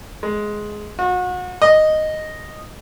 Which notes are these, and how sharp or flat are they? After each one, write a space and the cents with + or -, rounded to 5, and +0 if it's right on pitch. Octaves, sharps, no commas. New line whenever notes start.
G#3 +10
F#4 -35
D#5 -5